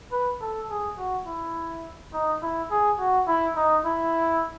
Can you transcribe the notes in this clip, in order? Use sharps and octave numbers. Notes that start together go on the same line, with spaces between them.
B4
A4
G#4
F#4
E4
D#4
E4
G#4
F#4
E4
D#4
E4